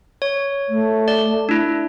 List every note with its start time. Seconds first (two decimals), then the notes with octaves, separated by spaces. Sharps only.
0.22 C#5
0.68 A3
1.08 D5
1.49 D4 E4